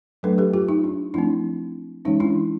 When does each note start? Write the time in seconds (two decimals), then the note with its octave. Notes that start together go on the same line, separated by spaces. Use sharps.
0.23 F#3 A3 D4 A4 B4
0.38 G4 A4
0.54 F4 G4
0.69 D#4
0.84 D4
1.14 F3 A3 C4 D4 E4
2.05 E3 G#3 C#4 D#4
2.20 D4 E4